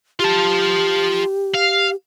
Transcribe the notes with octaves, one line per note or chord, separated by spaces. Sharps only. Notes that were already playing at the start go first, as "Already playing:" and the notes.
F4 G4 A5
F5